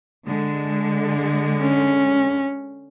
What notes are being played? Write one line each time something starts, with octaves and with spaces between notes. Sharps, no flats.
D3 G#3
C#4